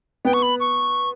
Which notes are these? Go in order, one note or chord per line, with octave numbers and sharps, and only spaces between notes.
B3 G5
C#6
B5
C#6